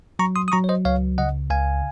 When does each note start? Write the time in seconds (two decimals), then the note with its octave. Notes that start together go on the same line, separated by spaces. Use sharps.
0.19 F#3 A#5 C#6
0.36 C6 D#6
0.48 D#6
0.52 F#3 A#5 C#6
0.64 C#5
0.69 C5 D#5
0.85 C#2 C#5 F5
1.18 C#3 D#5 F#5
1.50 C#2 F5 G#5